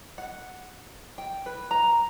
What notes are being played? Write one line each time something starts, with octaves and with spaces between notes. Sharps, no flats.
F#5
G5
B4
A#5